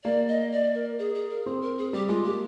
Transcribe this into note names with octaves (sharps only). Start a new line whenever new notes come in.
A#3 D5
D#5
D5
A#4
G#4
G#4
A#4
C4 G#4
A#4
G#4
G3 G4
G#3 F4
A#3 G4